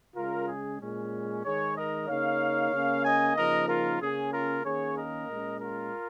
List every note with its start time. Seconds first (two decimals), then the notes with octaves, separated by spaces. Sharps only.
0.16 C#3 G#3 C#4 F4 A#4
0.48 G#4
0.80 A#2 G#3 C#4
1.44 D#3 G#3 D#4 G#4 C#5
1.77 A#4 D#5
2.08 C#3 A#3 D#4 C#5 F5
2.73 C#3 A#3 C#4
3.05 D#5 G#5
3.37 C#3 F3 A#3 D#4 A#4 D#5
3.68 F4 A#4
4.01 C#3 A#3 C#4 G#4
4.33 F4 A#4
4.65 D#3 A#3 C#4 G#4 C#5
4.97 A#4 D#5
5.29 A#2 G#3 C#4
5.61 F4 A#4